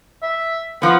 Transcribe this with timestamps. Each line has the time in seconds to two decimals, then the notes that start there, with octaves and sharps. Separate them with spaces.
0.23 E5
0.82 F3 B3 F#5